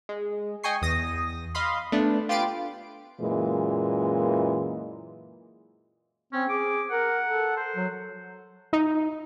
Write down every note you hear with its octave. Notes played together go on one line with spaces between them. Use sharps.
G#3
D#5 G5 G#5 C#6 C7
E2 D#6 A#6
D#5 F5 B5 C6
A3 B3 D4
F4 G4 B4 A6 C7 D7
F#2 A#2 E3 G#3
C4 C#4
G#4 D6
A#4 F#5
A4
C5
F#3
D#4